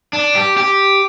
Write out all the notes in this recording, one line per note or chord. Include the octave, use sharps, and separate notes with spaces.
D4
G4
G4